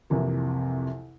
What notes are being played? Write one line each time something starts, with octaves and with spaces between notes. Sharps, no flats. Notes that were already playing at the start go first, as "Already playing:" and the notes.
C2 F2 C3 E3 A#3